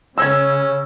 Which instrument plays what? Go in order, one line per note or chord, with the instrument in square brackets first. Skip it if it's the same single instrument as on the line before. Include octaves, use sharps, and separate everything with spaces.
[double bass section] C#3 [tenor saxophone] C#4 [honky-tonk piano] E6 G#6